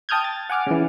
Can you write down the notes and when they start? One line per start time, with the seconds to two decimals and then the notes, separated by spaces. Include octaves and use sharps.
0.09 G5 A5 D#6 F6 G6 G#6
0.24 A6
0.50 F#5 G#5 D6 F6
0.67 C#3 E3